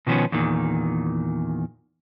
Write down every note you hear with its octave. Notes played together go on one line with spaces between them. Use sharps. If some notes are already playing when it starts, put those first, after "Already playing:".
B2 D#3 F3 B3 C#4
E2 A#2 D#3